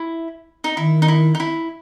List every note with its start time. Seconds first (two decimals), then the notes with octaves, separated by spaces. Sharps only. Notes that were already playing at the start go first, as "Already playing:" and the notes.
Already playing: E4
0.64 D#4
0.77 D#3 E4
1.02 D#4
1.08 E4
1.35 D#4
1.40 E4